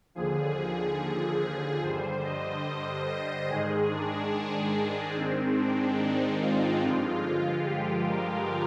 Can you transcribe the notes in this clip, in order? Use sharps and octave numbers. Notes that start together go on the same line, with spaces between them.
D#2 D3 F3 G#4
G#4
G#4
G#4
G2 D3 G3 C5
D#5
D#5
G#2 D#3 G#3 G#4
D4
G#2 D#3 G#3 C4
D4
D#4
F4
G2 D3 F3 G#3
G4
A#4